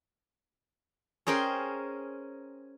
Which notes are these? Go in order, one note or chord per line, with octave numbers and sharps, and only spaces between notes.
C#4 G#4 A#4 C5 G5